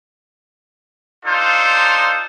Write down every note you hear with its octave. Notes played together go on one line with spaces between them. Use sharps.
D4 D#4 F4 A4 C5